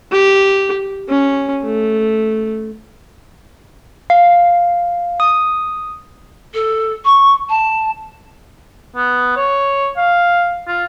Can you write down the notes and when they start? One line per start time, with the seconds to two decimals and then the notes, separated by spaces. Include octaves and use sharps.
0.12 G4
1.09 C#4
1.63 A3
4.10 F5
5.20 D#6
6.54 A4
7.05 C#6
7.49 A5
8.96 B3
9.36 C#5
9.97 F5
10.67 F4